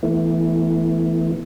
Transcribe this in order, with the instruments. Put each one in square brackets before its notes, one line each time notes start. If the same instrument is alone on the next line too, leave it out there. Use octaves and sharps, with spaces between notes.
[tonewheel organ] E3 A3 B3 E4